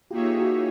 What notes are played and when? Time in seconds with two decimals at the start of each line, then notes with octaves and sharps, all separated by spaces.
0.11 A#3 D#4 F4 G4 G#4 C#5 E5
0.37 E4 F#4